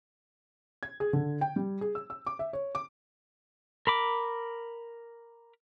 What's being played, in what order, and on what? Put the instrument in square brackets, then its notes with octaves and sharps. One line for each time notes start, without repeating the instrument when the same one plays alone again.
[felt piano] G#6
G#4
D3
G5
G3
G#4
E6
E6
D6
E5
C#5
D6
[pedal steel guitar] A#4 B5 D6